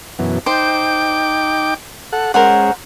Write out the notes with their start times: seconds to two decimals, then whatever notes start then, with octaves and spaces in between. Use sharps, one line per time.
0.19 F#2 B2 E3
0.46 D#4 C5 G5 D6
2.13 A4 F#5
2.34 G#3 C#4 A#4 C5 F#5